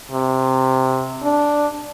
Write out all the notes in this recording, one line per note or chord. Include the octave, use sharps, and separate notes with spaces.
C3
D4